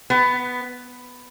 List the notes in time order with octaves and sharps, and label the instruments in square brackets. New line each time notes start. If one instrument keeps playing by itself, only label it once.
[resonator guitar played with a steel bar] B3